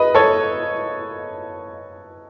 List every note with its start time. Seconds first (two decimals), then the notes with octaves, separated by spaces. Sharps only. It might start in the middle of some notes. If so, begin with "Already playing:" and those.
Already playing: B4 D#5
0.15 A4 C#5